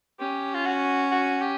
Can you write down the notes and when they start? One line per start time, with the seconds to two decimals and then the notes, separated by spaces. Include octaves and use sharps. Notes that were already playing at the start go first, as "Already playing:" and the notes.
0.20 C#4 G4
0.54 F4
0.65 F#4
1.11 F#4
1.41 G4